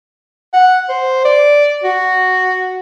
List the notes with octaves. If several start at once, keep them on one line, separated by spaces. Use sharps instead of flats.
F#5
C5
D5
F#4